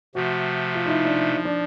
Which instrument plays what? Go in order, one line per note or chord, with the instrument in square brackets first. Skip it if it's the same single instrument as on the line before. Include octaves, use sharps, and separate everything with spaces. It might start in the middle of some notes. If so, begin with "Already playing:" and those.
[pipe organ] C3 F3 A3 [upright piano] F#4
[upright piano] F4
D#4
E4
D4
[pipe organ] F3
[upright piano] D4